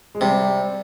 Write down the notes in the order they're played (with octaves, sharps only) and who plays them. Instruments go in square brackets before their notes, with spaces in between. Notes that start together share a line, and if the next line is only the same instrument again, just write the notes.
[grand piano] G#3
[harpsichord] C3 [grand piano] G3